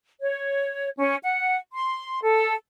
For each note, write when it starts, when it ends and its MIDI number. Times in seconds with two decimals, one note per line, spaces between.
0.20 0.89 73
0.98 1.14 61
1.23 1.56 78
1.73 2.19 84
2.22 2.53 69